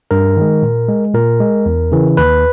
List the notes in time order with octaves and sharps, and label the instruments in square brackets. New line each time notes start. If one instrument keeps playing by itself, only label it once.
[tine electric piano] G2 A#4
D#3 G#3
A#2
G#3
A#2 A#4
G#3
E2
C#3 E3
D#2 B4